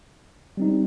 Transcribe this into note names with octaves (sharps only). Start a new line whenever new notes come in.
G3 C4 D#4